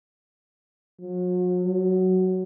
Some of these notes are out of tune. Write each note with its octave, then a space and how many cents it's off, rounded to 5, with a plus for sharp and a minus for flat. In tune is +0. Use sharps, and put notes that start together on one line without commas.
F#3 -45
F#3 +5